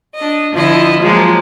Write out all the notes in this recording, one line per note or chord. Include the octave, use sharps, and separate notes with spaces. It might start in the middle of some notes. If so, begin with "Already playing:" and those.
D4 D#5
D3 F3 E4 D#5
F3 F#3 G#3 A#3